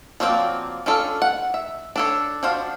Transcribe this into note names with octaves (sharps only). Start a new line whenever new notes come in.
F3 F#3 A#3 C4 D5
C#4 D4 F4 A4
F#5
E5
D4 A4 C#5
F3 D4 F#4 C5 F5